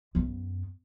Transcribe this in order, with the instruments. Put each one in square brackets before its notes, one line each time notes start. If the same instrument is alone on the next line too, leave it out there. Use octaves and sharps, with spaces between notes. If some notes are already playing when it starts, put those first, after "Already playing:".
[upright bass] F#2 B3